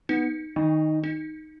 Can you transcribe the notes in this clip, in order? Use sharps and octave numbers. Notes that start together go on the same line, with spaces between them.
B3 D#4
D#3 D#4
D#4